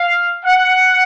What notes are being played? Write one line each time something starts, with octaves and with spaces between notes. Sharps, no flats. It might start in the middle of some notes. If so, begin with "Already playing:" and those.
Already playing: F5
F#5